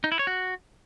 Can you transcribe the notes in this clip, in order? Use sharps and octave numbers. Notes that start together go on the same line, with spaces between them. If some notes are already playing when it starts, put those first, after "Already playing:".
D#4
E4
C#5
F#4